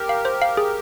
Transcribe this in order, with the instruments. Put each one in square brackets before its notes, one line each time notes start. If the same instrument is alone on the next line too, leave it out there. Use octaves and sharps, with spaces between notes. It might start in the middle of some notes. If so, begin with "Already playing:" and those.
Already playing: [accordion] G4 A#4
[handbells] F5
C5
F5
G#4